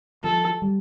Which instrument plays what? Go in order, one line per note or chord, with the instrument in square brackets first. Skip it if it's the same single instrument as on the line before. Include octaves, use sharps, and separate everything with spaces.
[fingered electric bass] F3 [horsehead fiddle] A4
[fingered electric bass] G3